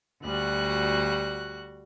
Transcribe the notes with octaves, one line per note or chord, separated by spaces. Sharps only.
D2 G3 F#4 F#6